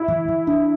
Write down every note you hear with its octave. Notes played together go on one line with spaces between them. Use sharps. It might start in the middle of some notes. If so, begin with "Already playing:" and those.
Already playing: E4
E3
E3
D4